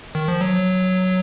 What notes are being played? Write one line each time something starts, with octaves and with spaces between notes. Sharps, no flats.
D#3
F3
F#3